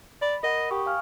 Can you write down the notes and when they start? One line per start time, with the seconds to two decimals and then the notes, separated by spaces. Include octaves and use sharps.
0.22 D5 B5
0.43 A#4 D#5 F#5 B5
0.71 G4 G5 C#6 D#6
0.86 F5 G#5 F6